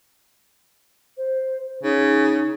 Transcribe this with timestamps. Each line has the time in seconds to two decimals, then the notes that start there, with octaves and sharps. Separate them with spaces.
1.17 C5
1.83 C#3 D#4